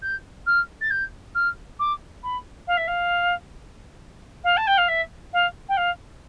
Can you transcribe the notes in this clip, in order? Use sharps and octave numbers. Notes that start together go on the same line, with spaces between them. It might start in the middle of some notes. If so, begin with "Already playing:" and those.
G6
F6
A6
G6
F6
D6
B5
F5
E5
F5
F5
A5
G5
F5
E5
F5
G5
F5